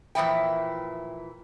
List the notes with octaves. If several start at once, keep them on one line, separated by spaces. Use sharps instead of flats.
A#2 E3 F3 D#4 E4 G5